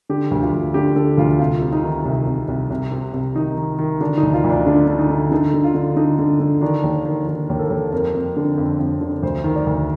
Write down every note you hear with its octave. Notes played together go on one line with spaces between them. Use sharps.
D3 G4
D2
F4
D2
D3 G4
D3 A4
D2 F4
C2 F4
C3
D#4
D#3
C2
C2
C2
C2
C3
C2
D#3 D#4
D#3
D#3
D3 D4
D#4
D2
F4
D2
D4
D3 D4
D3
D#4
D3
D3 D#4
D3
F4
D3
D3 D#4
D3
D3
D#3 D4
D#2
D#3
D#3
D#2 A#4
A4
D#2
F2 A#4
F2
D3
F2
F2
D3
D2 C5
D#3
D5
D2